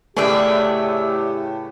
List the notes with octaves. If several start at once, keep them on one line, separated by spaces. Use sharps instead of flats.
A2 C#3 A3 B3 G4 G#4 D5 E5